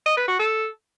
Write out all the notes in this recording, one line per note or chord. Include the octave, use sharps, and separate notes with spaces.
D#5
B4
F#4
A4